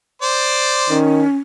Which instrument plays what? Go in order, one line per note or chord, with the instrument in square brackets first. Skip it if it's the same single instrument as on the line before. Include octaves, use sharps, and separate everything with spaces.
[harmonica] C5 D5
[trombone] D#3 [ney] C#4